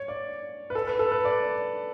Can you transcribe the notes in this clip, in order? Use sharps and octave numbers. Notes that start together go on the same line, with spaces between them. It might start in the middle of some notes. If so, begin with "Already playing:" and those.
Already playing: C#5
D5
B4
A4
B4
A4
B4
D5